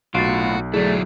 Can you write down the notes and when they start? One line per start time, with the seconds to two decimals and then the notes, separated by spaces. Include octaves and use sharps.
0.15 B1 A2 F4 F#4 A6 C7 D7
0.74 F#3 A3 E4 G#4 D5